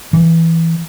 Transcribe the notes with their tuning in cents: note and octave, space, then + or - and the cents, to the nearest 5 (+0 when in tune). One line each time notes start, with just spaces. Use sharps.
E3 +0